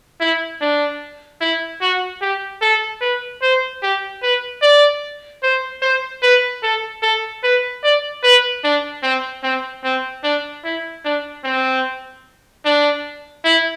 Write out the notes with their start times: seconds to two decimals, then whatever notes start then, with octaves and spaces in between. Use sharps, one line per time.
0.20 E4
0.61 D4
1.41 E4
1.81 F#4
2.22 G4
2.62 A4
3.01 B4
3.42 C5
3.83 G4
4.23 B4
4.62 D5
5.43 C5
5.82 C5
6.23 B4
6.63 A4
7.02 A4
7.44 B4
7.84 D5
8.24 B4
8.64 D4
9.03 C4
9.43 C4
9.84 C4
10.24 D4
10.65 E4
11.05 D4
11.44 C4
12.65 D4
13.44 E4